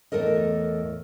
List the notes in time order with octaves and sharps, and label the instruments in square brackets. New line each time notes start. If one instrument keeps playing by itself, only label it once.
[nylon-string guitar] E2 A2 A3 A4 A#4 D#5